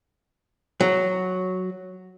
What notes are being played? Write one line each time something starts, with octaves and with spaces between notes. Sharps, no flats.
F#3